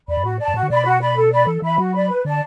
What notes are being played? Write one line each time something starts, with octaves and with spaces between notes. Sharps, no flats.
E2 D5 B5
F#2
A2 F#4
D5 A5
F#2
A2 F#4
D3
B2 D5 B5
F#4
D5 B5
A4
D5 B5
E3 A4
E3 E5 B5
F#3 F#4
D5 B5
B4
D3 D5 A5